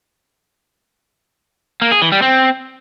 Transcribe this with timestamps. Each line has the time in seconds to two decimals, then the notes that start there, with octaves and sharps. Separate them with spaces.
1.82 A#3
1.92 G#4
2.02 E3
2.12 G3
2.22 C4